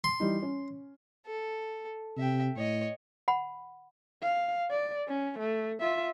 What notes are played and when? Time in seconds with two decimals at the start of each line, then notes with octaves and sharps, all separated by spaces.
0.04 C6
0.20 E3 G3 D#4
0.43 C#4
1.26 A4
2.17 C3 E5 G5
2.56 A2 C#5 D#5
3.28 F#5 B5
4.22 F5
4.70 D5
5.08 C#4
5.39 A3
5.80 F4 E5